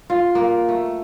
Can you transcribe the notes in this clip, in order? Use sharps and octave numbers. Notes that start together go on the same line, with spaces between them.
F4
A#3
A3